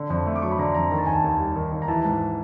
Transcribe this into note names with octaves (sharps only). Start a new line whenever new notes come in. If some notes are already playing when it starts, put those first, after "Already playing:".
Already playing: D3
F2
A3
D6
F#3 C#6
B5
D3 A#5
F2 A#5
D#3 A#5
A5
D#2 G#5
A5
D#2
G3
D#3
D#2
A#5
E3 A5
G#2